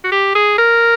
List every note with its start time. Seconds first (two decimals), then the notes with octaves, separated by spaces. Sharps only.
0.04 F#4
0.12 G4
0.35 G#4
0.58 A#4